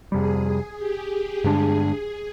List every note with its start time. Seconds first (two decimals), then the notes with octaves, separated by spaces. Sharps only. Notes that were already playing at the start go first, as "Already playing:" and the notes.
0.12 F2 C3 G3 G#4
0.78 G4
1.44 G2 D3 G#3 D4 G#4